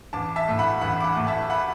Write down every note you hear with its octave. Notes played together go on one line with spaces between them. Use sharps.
A1 A5 D6
E5 A5
A2 A3
F#5 B5
A1 F#5 B5
D6
F#5 B5
A2 A3
E5 A5
F#5 B5